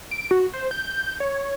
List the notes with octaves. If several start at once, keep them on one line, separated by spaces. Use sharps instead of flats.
D7
F#4
C5
G6
C#5